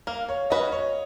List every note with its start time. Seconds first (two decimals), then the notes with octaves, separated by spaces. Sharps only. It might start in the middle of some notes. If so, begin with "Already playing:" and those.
0.07 A#3 F5
0.29 C#5
0.50 C#4 F#4 B4 D#5
0.72 C#5